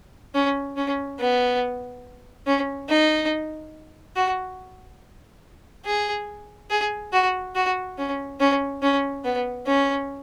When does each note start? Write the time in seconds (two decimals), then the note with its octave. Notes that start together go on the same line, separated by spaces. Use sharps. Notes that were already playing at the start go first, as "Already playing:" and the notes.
0.34 C#4
0.76 C#4
1.19 B3
2.46 C#4
2.89 D#4
4.16 F#4
5.85 G#4
6.70 G#4
7.12 F#4
7.55 F#4
7.98 C#4
8.40 C#4
8.82 C#4
9.24 B3
9.67 C#4